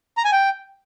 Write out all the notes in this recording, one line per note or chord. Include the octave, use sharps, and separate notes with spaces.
A#5
G#5
G5